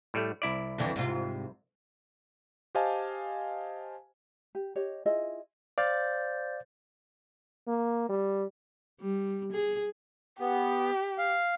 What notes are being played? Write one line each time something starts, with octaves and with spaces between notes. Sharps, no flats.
A2 G3 A3
C2 E4 D5
F2 D3 E3
G#2 C3 F4
G4 C5 D#5 F5 G#5 A5
G4
G4 C#5 D#5
E4 F4 G#4 D#5
C5 D5 F5 G6 A6
A#3
G3
G3
G#4
B3 G4
F5